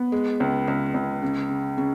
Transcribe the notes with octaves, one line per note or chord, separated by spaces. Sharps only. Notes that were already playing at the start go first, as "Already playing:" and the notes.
Already playing: B3
G#3
C#2
C#2
C#2
C#3
C#3
C#3